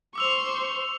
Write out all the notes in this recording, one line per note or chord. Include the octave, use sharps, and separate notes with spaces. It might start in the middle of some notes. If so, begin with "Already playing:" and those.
C5 C#6 D6 E6 F7